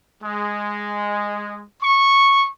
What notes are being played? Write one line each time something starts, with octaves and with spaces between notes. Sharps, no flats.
G#3
C#6